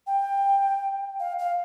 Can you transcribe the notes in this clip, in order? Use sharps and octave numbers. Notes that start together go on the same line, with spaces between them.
G5
F5
F5